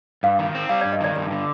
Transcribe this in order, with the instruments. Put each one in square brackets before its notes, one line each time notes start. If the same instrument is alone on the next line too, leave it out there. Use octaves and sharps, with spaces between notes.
[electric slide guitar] G2 [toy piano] F5
[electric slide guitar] D#3
C4
[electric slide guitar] G3 [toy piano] F5
[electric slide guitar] G2 [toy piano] D5
[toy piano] D#5
[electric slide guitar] D#3 [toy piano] D5
[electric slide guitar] G2 [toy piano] D5
[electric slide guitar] D3